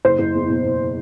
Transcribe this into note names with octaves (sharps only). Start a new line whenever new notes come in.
F#1 C5
F#1
E2
B2
B2